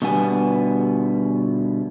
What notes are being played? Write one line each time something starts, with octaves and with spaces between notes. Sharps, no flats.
B2 D3 G3 B3 G#5